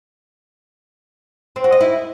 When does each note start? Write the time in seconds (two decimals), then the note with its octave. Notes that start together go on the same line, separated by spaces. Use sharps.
1.56 C4
1.64 F#4
1.72 D#5
1.81 E4